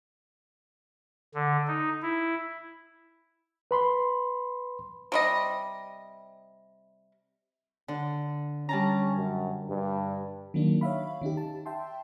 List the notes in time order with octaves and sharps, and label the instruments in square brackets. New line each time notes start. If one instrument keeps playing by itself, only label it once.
[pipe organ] D3
D#4
E4
[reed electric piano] B4 B5 C6
[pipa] C3 G3 D#5
[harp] D3
[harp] G3 A5 A#5 [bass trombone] C#4
[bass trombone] F#2
G2
[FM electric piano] D#3 F#3 A#3 D4
C#5 E5 F5 B5
D#3 C#4 D#4 G4
A5
E5 G5 A5 C6